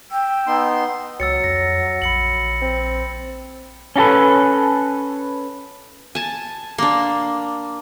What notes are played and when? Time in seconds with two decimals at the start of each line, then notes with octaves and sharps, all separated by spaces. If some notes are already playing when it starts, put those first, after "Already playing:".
0.12 G5 E6
0.47 B3 D#4 C6
1.20 C#2 F#3 E6 A6 C#7
1.44 F2 A#6
2.02 A#1 B5 C#7 F#7
2.62 C4
3.96 C#4 D#4 F#4 A4 B4
6.15 G#5 A5
6.78 A#3 D4 C6